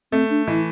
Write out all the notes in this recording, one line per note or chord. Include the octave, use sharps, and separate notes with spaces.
A3 C4
D4
E3 E4